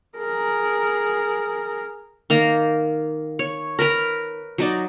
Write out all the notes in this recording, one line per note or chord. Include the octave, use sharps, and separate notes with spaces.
G#4 A#4
D#3 A#3 A#5
C#5
A#4 B4 A#5
F#3 D#4 D5